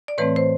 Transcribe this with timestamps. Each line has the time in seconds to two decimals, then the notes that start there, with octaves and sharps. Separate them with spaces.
0.08 D5
0.18 A2 E3 A3 C4 B4 C#5
0.36 C5